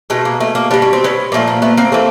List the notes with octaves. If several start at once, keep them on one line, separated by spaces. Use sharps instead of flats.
B2 G#3 A3
A#3
A3
A#3
B2 G3 D4
C#4
C4
B3 C#4
A#2 F3 A3 A#3
A#3
A3 B3
A#3 C4
E3 A3 A#3 C4